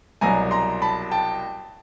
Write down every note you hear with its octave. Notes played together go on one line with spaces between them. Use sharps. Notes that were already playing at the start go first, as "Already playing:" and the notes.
C2 B2 F#3 G#5 A#5
A#5 C6
A5 B5
G5 A5